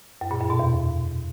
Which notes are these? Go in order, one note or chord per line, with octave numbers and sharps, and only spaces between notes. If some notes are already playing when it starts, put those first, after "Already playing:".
F#2
A#2
F#2
B2
E2